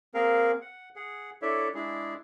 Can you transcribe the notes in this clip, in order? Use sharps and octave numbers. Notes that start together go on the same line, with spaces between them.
A#3 C4 G#4 A#4 F5
F#5
G#4 F#5
D4 E4 A4 C#5 D5 E5
G#3 D4 E4 G#4